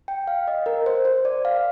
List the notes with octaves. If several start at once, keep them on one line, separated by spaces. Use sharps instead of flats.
G5
F5
D#5
A#4
C5
C5
D5
F5